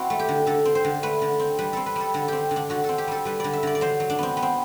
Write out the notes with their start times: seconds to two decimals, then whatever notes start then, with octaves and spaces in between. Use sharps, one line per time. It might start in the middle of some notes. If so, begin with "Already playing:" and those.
Already playing: C4 E4 F#4
0.10 A3
0.19 G4
0.29 D3
0.47 D3 A4
0.65 C4
0.75 C5
0.84 D3
1.03 A3 B4
1.22 D3
1.39 C4
1.59 G3 B4
1.73 C4 A4
1.86 B4
1.96 G3 A4
2.14 D3 A4
2.28 C4 G4
2.51 D3
2.56 D4
2.70 D3 F#4
2.84 A4
2.89 C4
2.98 G4
3.08 G3 A4
3.25 G3 B4
3.40 D3 D5
3.53 E5
3.63 D3 D5
3.75 D5
3.81 F#3 C5
4.00 F#3
4.10 D4
4.19 B3 C4
4.37 B3
4.43 C4